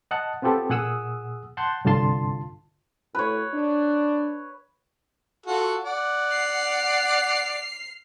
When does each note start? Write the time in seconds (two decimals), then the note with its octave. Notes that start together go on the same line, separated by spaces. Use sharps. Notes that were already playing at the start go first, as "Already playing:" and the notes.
0.11 D#5 F#5 A5
0.42 B3 C4 F4 G4 A4
0.70 A#2 G#4 F#5 D#6 E6
1.57 F#5 A5 C6 G6
1.85 C2 G2 D3 F4 A5 C6
3.15 A2 B4 C#5
3.54 D4
5.46 F4 F#4 A4
5.84 D5 F#5
6.32 F6 C7